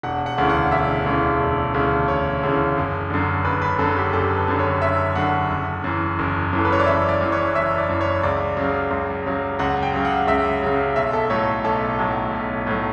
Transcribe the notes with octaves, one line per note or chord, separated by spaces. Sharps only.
E1 F#5
F#5
D2 C#3 E3
F#5
E1 E5
D2 C#3 E3
E1
D2 C#3 E3
E1 C#5
D2 C#3 E3
F#1
F#2 D3
F#1 B4
B4
F#2 D3 A4
G4
F#1 A4
B4
F#2 D3
C#5
F#1 E5
F#2 D3 F#5
F#1
F#2 E3
F#1
F#2 E3
A4
B4
C#5
D5
F#1 E5
D5
F#2 E3
C#5
F#1 E5
D5
F#2 E3
C#5
C#2 D5
C#3 F#3
C#2
C#3 F#3
C#2 F#5
G5
C#3 F#3
F#5
C#2 E5
C#3 F#3
B1 E5
A4
A2 F#3 C#5
B1 A4
A2 F#3
B1
A2 F#3